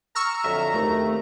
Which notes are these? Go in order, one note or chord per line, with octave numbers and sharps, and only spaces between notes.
A#5 C#6 E6 F6
F2 D3 F#3 E5
D#2 C3 A3